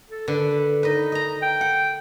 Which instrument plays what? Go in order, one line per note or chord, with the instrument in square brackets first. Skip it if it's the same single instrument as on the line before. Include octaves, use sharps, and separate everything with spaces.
[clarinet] A4
[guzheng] D3 [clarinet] B4
[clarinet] D#4 [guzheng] B4 D#5
[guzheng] D#5 A#5
[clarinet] G5
[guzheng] F#5